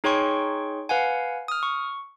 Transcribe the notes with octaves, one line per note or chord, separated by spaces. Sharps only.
D#4 G#4 C#5 G5 C6 C#6
B4 F5 F#5 G#5
D#6 F6
C#6